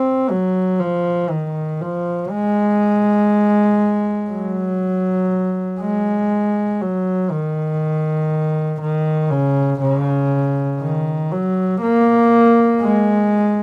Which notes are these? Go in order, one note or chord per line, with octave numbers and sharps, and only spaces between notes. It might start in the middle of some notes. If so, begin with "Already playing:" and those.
Already playing: C4
F#3
F3
D#3
F3
G#3
F#3
G#3
F#3
D#3
D#3
C#3
C#3
D#3
F#3
A#3
G#3